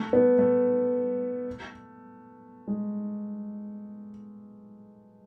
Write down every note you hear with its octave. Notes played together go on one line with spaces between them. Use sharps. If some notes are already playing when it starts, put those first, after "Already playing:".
Already playing: A3
B3
A3
G#3